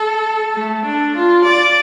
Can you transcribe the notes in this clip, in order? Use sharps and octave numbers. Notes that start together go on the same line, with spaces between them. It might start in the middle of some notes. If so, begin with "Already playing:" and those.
Already playing: A4
A3
D4
F4
D5